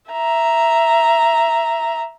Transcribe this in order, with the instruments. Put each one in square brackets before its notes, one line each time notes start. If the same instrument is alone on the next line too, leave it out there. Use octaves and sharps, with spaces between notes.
[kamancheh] E5 A#5